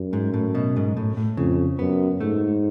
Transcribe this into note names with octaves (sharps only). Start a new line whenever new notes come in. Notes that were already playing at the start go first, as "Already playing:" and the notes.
Already playing: F#2
G#2
A2
B2
G#2
A2
A2
F2 C#3
F#2 B3
G#2 A3